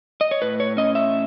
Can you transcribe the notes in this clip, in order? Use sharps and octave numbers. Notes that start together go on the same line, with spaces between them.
D#5
C#5
A2 B4
C#5
C#4 D#5
E5